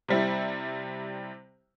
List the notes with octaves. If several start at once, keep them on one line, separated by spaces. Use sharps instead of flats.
C3 G3 E4